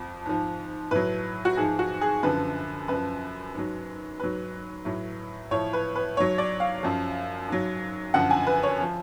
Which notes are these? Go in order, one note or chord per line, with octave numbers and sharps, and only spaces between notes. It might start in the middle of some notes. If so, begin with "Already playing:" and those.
Already playing: F2 F3
G#2 F3
A2 F#3 B4
F#4
G#2 F3 G#4
F#4
G#4
F#2 D3 F3 B4
F#2 F3 B4
G#2 F#3
G#2 F#3 B4
A2 F#3
A2 F3 C#5
B4
B4
G#2 F#3 C#5
D5
F5
F#2 F3
G#2 F#3
F#2 D3 F3 F#5
G#5
B4
C#5
F3